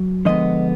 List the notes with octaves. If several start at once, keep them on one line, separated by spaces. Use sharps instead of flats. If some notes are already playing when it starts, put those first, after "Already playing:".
Already playing: F#3
D3 F3 G#3 B3 D#5